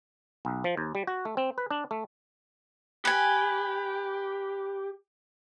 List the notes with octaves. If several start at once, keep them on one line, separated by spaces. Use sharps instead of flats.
B1
F3
D#2
G3
F#4
A3
C4
B4
D4
A3
G4 B4 G#5